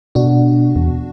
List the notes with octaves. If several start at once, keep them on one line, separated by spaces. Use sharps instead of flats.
B2 D4 F#4
E2